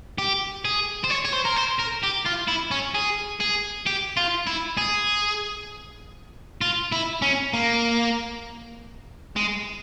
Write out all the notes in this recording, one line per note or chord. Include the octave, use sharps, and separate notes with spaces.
G4
G#4
C5
C#5
C#5
C5
A#4
C5
A#4
G4
F4
E4
C#4
G#4
G#4
G4
F4
E4
G#4
F4
E4
C#4
A#3
G#3